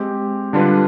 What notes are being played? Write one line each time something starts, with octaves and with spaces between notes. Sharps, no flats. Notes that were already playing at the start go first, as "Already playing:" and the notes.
Already playing: G#3 C4 G4
D3 G3 D4 F4 B4